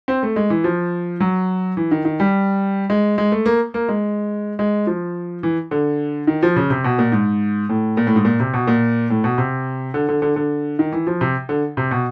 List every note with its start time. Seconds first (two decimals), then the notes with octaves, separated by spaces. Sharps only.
0.08 C4
0.23 A3
0.36 G#3
0.50 E3
0.64 F3
1.20 F#3
1.77 E3
1.91 D#3
2.05 D#3
2.20 G3
2.90 G#3
3.18 G#3
3.32 A3
3.46 A#3
3.74 A#3
3.89 G#3
4.59 G#3
4.87 F3
5.43 E3
5.71 D3
6.27 D#3
6.43 F3
6.56 C#3
6.70 C3
6.84 B2
6.98 A#2
7.12 G#2
7.69 A2
7.97 A#2
8.07 A2
8.16 G#2
8.25 A#2
8.40 C3
8.53 B2
8.67 A#2
9.10 A2
9.24 B2
9.38 C3
9.94 D3
10.09 D3
10.22 D3
10.36 D3
10.79 D#3
10.92 E3
11.07 F3
11.21 C3
11.49 D3
11.77 C3
11.91 B2